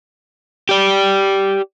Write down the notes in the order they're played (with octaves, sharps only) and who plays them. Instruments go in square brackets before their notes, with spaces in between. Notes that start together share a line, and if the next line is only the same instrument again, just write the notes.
[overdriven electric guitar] G4 D5